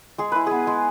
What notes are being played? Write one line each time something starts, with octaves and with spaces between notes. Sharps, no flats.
G#3 G#4
E4 B4
B3 G#4
G#3